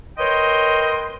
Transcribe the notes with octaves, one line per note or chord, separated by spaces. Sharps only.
A#4 B4 C#5 D#5 G5 C6